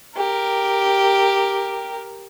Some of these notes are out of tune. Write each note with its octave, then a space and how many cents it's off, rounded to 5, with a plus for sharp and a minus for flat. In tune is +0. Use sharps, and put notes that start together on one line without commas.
G4 +0 A#4 +0